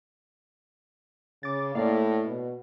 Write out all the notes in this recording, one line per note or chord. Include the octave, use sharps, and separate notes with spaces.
C#3 D6 A6
A2 A#3 D5 F5
B2